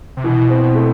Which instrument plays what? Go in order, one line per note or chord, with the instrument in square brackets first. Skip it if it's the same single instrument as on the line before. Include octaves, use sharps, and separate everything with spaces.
[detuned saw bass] C3
[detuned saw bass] B2 [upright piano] E3
[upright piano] C4
A3